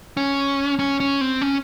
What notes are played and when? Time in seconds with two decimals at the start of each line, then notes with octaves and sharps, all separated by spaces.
0.17 C#4
0.79 C#4
1.00 C#4
1.21 C4
1.41 C#4